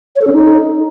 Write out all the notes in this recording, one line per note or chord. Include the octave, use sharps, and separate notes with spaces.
C#5
A4
C#4
D#4